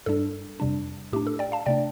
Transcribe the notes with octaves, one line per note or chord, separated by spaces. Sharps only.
G2 G3 D4 A4
F2 C3 G3 D4
A2 A3 D4 G4
A4
D5 G5
F5 A5
C3 A3 D4 D5 G5